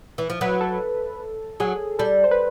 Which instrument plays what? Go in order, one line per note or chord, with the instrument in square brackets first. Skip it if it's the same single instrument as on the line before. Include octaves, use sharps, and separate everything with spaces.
[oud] E3
F3
[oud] F#3 [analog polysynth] B4
[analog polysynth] A4
[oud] F#3 [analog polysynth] G#4
[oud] G3 [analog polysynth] A4
[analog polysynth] C5
B4